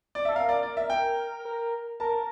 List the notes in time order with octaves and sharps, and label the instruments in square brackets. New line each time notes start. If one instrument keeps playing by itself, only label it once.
[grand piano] D5
[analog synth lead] A4 [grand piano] E5
[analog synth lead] A#4 [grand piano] F5
[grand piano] D5
D5
E5
G5
[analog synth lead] A#4
[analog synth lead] A#4 [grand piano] A5